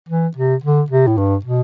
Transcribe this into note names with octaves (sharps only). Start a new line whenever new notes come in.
E3
C3
D3
C3
A2
G2
B2